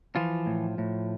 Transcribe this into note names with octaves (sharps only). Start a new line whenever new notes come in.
E3 F3 F4
A2
A2